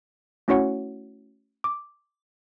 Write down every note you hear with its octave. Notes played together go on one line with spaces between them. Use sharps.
A3 C#4 E4 F#4 C#5 F#5
D6